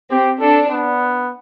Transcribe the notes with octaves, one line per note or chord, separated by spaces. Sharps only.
C4 G4
D4 A4
B3